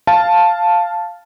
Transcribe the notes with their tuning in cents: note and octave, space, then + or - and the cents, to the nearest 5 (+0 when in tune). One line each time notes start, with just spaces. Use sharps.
F5 +0 A5 +0